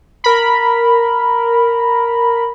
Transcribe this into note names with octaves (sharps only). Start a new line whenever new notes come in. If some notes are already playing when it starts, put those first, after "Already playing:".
A#4 B5